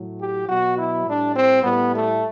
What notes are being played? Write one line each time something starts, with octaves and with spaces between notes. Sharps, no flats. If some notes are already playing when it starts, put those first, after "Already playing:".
Already playing: A2 F#3
G4
B2 F#3 F#4
E4
A2 G3 D4
C4
A2 G3 B3
A3